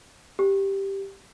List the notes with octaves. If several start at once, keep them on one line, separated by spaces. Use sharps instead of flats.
G4